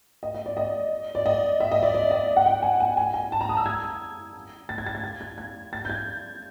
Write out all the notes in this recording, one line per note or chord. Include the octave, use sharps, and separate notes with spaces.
D#5
D#5
D5
D#5
D5
D#5
E5
D#5
D5
D5
D#5
F#5
G5
G#5
G#5
G#5
G#5
A5
A#5
D#6
E6
G#6
A6
G#6
A6
G#6
A6
G#6
G#6
A6
G6
G#6